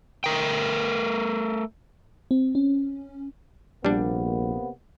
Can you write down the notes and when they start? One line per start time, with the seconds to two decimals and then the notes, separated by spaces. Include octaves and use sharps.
0.24 A3 A#4 G5
2.31 C4
2.55 C#4
3.85 A#1 C3 G3 A#3 B3 D4